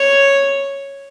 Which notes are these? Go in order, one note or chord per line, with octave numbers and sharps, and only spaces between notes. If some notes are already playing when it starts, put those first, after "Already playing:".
Already playing: C#5